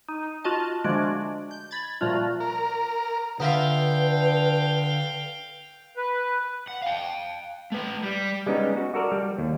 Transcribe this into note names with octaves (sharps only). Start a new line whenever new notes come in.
D#4
F4 F#4 D#5 A5
D3 F3 G#3 A3 D4 F#4
G6
B5 G#6 A6
A#2 F3 G3 A3 F4 F#4
A#4
D3 B3 F4 B4 E5 F5 G5
B4
F#5
F5 G5
A3 B4
G3
G3 G#3 B3 C#4 D#4
F#4
F#4 A4 A#4 D5
G3
D#2